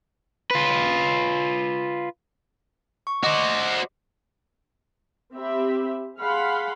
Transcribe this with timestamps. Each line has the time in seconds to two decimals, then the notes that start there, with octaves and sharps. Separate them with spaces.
0.51 F4 B4
3.07 C#6
3.23 F#4 C5 D#5 D6
5.35 C4 G4 E5 B5
6.18 G#4 F5 F#5 B5 C6